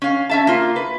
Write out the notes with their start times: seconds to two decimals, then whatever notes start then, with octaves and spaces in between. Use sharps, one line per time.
0.02 C#4 F5
0.29 C#4 E5 A5
0.47 A#3 F4
0.76 B4